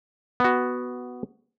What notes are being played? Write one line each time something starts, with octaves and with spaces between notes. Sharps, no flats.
B3 F#4